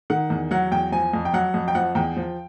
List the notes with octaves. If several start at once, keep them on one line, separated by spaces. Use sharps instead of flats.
D#3 F#5
E2
F#3 F#5
E2 G5
F3 G#5
F2
G5
F#3 F#5
F2
G5
F3 F#5
E2 G5
F3